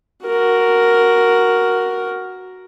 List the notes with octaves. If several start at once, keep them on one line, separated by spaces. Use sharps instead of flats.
F#4 A#4